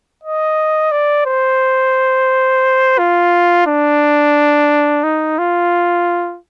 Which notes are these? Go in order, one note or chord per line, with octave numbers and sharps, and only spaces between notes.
D#5
D5
C5
F4
D4
D#4
F4